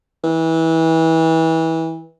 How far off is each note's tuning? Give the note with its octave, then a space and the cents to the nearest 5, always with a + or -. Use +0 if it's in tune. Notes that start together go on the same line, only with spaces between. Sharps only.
E3 -25